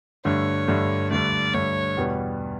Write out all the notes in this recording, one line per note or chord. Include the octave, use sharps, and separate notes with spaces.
G2 D3 A3 C#5
G2 D3 A3
G2 D3 A3 D5
G2 D3 A3 C#5
E2 B2 G3 B3